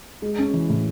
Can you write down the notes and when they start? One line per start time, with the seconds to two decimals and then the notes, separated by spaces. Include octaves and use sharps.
0.22 G#3
0.39 C#4
0.53 E3
0.70 A2